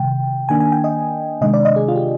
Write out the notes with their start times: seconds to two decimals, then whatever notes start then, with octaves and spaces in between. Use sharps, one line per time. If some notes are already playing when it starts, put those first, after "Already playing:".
Already playing: C3 D#3 G3 G5
0.49 D#3 A#3 D4 G#5
0.60 G#5
0.72 G5
0.84 D#5
1.41 C3 D#3 G#3 D4 D#5
1.54 D5
1.65 D#5
1.76 G#4
1.88 F4
1.96 G4